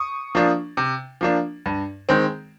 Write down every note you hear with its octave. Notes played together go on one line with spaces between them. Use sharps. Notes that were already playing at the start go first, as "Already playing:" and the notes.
Already playing: C#6 D#6
F3 A#3 D4
C3
F3 A#3 D4
G2
D#3 G#3 C4